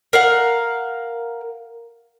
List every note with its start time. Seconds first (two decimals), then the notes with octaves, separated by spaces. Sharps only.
0.13 A#4 F5 F#5